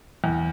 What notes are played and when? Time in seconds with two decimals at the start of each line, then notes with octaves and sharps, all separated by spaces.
0.24 E2